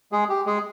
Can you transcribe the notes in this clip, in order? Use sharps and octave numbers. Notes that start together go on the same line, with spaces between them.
G#3 G#4
G4
G#3 G#4